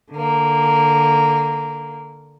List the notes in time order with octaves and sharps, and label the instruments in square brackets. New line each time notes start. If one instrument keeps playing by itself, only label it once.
[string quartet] D3 A#3